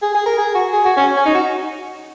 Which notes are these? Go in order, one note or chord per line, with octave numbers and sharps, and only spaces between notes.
G#4
G#4
A#4
G#4
F#4
G#4
F#4
C#4
C#4
D#4
F#4